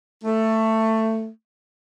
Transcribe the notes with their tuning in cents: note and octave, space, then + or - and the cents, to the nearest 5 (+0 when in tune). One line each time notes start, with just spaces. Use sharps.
A3 +15